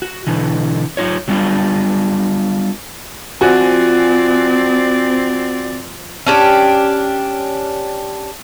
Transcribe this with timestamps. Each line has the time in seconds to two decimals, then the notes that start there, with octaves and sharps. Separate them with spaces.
0.02 F#4
0.27 B2 D3 E3
0.97 F#3 D#4 F4 C#5
1.28 F#3 G3 B3 D4 F4
3.41 F3 C4 F#4 D5 E5 G#5
6.26 C#4 D4 G4